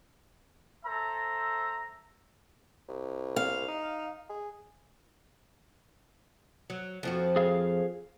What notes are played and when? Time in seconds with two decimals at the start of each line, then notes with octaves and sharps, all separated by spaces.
0.85 A4 C5 E5 A#5
2.89 C2
3.36 F5
3.68 D#4
4.29 G#4
6.70 F#3
7.03 F2 F3 F#4
7.36 G#4 F5